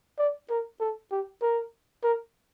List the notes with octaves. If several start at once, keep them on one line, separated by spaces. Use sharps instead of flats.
D5
A#4
A4
G4
A#4
A#4